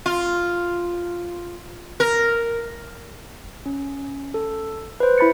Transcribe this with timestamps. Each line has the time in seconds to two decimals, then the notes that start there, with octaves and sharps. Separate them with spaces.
0.06 F4
2.00 A#4
3.66 C#4
4.34 A4
5.00 B4 C5
5.18 E4 B5 A6 C#7